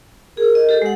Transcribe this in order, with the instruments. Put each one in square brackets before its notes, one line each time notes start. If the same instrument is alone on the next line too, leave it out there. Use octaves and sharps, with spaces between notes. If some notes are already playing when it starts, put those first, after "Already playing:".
[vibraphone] G#4 [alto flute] A#4
[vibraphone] D#5
G4 A4
G#3 F#5